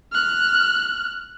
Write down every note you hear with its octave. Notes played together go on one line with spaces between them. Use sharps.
F6 F#6